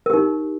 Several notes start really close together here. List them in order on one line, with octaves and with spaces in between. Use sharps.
A#4 G4 D#4